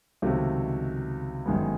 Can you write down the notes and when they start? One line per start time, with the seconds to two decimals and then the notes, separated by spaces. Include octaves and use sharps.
0.22 C#2 C3 D#3 F#3 A3
1.46 G1 F#2 D#3 G#3 B3